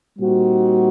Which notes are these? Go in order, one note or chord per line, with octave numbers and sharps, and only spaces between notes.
A#2 G3 C4 D#4 F#4